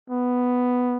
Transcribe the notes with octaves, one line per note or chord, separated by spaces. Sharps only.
B3